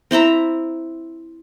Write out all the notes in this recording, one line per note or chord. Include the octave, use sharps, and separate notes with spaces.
C4 E4 E5 A#5